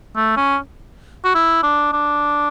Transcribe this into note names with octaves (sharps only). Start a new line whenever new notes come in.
A3
C#4
F#4
E4
D4
D4